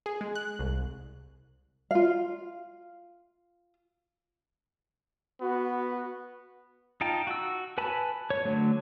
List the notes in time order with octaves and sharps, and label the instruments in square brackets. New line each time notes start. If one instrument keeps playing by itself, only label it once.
[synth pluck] G#4
G#3
F#6
C2
[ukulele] F4 F5
[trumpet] B3 [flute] F#4
[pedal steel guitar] D#4 F4 G5 A5 A#5
F#4 E6
B4 G#5 A5 B5
C#5
D3 F#3 A3